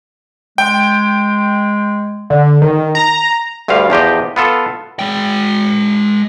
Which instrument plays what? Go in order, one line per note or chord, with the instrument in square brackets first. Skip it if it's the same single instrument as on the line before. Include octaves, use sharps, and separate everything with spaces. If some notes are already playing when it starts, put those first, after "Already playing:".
[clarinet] G#3 [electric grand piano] G5
[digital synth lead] D3
D#3
A#5
[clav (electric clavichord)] D2 G2 D3 G3 F5
E2 F3 G4 D#5
B3 F4 A4
[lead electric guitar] G#3 G5